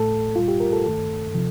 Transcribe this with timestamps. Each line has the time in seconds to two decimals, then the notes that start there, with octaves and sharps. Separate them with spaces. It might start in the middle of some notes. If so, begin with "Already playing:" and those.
Already playing: A2 A3 A4
0.35 A#2 G3 F4
0.48 G4
0.60 A#4
0.73 A4
0.85 G2 D#3 A3 A4
1.35 C3 F3